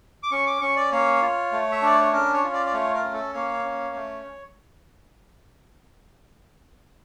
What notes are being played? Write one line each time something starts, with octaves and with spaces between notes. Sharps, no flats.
D6
C#4 C#6
D6
C#4 C#6
D5
A#3 C#5
F4
A3
E5
D4 D5
C#5
C#4 A#4
C#5
F4
D5
D5
A3 C#5
A#4
C#4
A4
A#3 C#5
C#4
A3